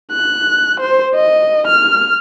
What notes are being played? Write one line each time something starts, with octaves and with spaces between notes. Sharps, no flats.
F#6
C5
D#5
F6